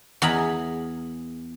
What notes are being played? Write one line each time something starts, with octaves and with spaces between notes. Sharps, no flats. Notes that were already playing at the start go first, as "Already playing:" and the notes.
E2 G#4 A#5 B5